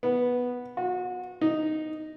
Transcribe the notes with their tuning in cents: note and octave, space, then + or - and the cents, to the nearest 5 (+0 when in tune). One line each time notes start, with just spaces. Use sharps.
B3 -5
F#4 -30
D#4 -5